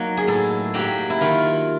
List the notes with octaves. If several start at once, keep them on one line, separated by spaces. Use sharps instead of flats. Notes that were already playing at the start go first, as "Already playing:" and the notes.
Already playing: F#3 A#3 D#4
G#4
A2 A4
F#3 A#3 G4
E4
D#3 F4